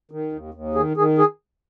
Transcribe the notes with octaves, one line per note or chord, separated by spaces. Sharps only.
D#3
D#2
D#2
D#3 G#4
D#3 G#4
G#4